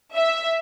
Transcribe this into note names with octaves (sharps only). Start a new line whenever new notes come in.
E5